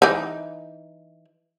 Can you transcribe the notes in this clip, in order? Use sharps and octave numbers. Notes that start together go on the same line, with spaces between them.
E3 D#4